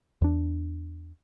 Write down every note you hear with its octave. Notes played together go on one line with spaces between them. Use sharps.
E2 D4